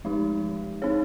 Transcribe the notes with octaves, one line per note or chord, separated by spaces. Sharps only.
F3 G#3 D#4 G4
C4 D#4 G#4 C#5